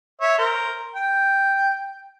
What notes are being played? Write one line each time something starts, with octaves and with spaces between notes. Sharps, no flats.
C#5 E5
A#4 C5
G5